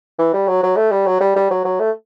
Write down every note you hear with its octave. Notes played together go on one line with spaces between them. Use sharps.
E3
G3
F#3
F#3
A3
G3
F#3
G3
G3
F#3
F#3
A3